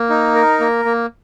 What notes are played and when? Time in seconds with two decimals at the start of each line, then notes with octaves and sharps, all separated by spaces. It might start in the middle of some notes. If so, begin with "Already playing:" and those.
Already playing: A#3
0.10 D#4
0.35 A#4
0.60 A#3
0.85 A#3